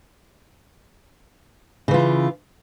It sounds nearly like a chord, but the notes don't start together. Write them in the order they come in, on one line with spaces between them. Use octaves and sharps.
C#3 E3 F4